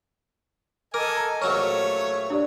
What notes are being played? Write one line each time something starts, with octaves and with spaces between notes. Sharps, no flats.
A4 A#4 D#5 G#5 D6
A#5
A#1 F#3 A3 C#4 C#5
D4 G4 D5